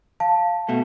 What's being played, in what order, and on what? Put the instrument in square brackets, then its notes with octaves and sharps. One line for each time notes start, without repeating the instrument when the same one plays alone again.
[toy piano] F5 [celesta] A5
[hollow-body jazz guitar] B2 A3